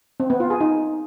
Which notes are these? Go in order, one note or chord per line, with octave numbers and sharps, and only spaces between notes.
C4
B3
F4
G#4
D#4